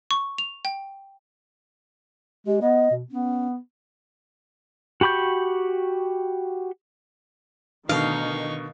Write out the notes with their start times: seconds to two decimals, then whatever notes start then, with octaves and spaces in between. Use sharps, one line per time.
0.11 C#6
0.38 F7
0.65 G5
2.47 G#3 G4
2.61 B3 D#5
2.91 B2
3.11 B3 C#4
5.01 F#4 G4 B5 C#6 G6
7.89 B2 D3 D#3 D#4 F5 C#6